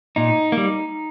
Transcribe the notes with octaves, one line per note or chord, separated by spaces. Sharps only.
A#2 D#4
A#3
G3